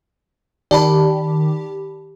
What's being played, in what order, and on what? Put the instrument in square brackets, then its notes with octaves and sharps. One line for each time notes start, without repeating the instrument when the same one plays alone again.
[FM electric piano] D#3 G4 [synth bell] D5 A5 B5